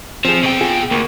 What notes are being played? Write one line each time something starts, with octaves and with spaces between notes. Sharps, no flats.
F3 C4 G#4
B2 G5
F4 G#4
D2 A#3